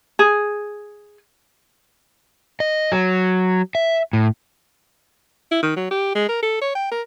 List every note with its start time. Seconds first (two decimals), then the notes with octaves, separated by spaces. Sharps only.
0.19 G#4
2.60 D#5
2.92 F#3
3.75 E5
4.13 A2
5.52 E4
5.63 D#3
5.76 F#3
5.91 G4
6.15 G#3
6.29 A#4
6.43 A4
6.62 C#5
6.75 G5
6.92 A#4